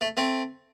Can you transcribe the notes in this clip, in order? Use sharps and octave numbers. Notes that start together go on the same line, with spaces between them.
A3
A3 C4